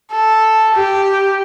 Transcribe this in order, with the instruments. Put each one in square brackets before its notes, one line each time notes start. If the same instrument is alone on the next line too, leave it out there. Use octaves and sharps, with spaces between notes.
[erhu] A4
G4